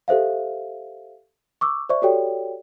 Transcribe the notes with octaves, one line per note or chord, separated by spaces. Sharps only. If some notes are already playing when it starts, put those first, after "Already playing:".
G4 A4 C5 E5 F5
C#6 D6 E6
C5 D5 E5 C#6
F#4 G4 A4 C#5 D5 G5